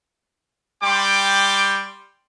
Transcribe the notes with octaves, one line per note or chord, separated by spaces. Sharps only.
G3 G5 C6 D6